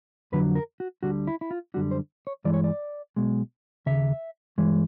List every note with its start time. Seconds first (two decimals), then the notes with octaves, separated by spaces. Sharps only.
0.32 F2 D3 F#3 B4
0.55 A#4
0.80 F#4
1.03 D2 D3 G3 F#4
1.27 E4
1.41 E4
1.51 F4
1.74 F#2 D3 G3 F#4
1.91 C5
2.27 C#5
2.45 G2 E3 G#3 D5
2.54 C#5
2.64 D5
3.16 B1 B2 G#3
3.86 D#2 C#3 E5
4.58 G2 E3 G#3